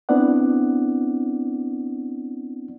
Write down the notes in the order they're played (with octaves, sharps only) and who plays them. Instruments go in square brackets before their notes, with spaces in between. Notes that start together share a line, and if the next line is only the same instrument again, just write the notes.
[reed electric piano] B3 C4 D4 E4 D5 F#5